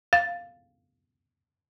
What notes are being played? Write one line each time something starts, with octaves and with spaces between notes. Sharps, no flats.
F5 A6